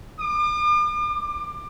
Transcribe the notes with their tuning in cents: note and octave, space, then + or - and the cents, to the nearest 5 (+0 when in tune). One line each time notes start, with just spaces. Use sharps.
D6 +45
D6 +20